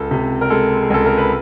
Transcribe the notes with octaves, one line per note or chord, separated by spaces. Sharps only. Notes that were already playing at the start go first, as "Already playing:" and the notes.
Already playing: C#2 A4
C3
A#4
G#3 A4
G#4
C#2 A4
A#4
B4